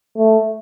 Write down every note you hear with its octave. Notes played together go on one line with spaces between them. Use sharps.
A3